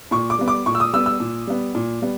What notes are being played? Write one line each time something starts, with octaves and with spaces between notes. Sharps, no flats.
A#2 C#6
D6
G3 B3
D6
A#2 C#6
E6
D#6
G3 B3 E6
E6
A#2
G3 B3
A#2
G3 B3